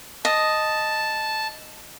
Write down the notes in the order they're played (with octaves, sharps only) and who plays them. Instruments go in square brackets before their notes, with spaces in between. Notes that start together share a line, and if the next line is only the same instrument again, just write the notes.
[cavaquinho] D#5 [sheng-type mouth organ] A5